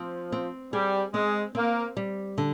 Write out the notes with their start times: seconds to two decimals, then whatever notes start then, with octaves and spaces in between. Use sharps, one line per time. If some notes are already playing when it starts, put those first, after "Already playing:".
Already playing: F3 C4
0.32 C4
0.73 G3 G#4
1.14 G#3 C4
1.55 A#3 C4
1.97 G3
2.38 D3